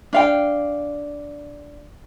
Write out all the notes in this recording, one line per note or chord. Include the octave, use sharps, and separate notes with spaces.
D4 F5 G5